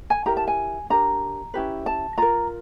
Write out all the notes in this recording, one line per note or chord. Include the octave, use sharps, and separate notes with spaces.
G#5
E4 G4 A#4 A#5
A5
G#5
D4 G4 A#4 A#5
C#4 E4 G4 B4
A5
F4 A#4 A#5